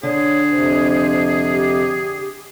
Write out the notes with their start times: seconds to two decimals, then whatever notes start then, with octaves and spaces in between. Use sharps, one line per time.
0.03 D3 G#4 C#5
0.51 F2 C3 C5
1.52 G4